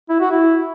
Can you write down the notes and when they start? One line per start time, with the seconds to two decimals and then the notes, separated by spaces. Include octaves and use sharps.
0.09 E4
0.20 F#4
0.31 E4